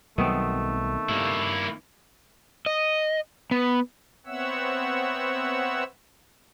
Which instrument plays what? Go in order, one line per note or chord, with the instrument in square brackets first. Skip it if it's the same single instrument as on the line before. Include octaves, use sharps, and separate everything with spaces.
[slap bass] B1 F#3 G3 [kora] D#3 B3 C4 [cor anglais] A3
[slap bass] G2 [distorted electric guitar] A#3 E4
[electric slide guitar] D#5
B3
[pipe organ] B3 C4 C#5 E5 F#5 E6